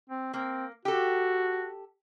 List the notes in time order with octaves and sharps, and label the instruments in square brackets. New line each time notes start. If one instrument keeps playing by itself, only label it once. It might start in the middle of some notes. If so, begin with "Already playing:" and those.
[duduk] C4
[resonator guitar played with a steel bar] A#3 [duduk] C4
[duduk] F#4 [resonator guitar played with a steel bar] G4 A4